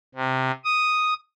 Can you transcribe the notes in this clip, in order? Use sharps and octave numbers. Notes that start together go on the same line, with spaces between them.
C3
D#6